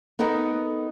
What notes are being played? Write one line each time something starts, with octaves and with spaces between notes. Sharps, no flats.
B3 D#4 A4 A#4 F#5